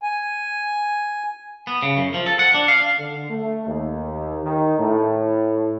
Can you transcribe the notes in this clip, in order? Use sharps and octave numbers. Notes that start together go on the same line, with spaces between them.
G#5
B3
C#3
F#2
F3
A4
F#5
D4
F5
D3
A3
D#2
D#3
A2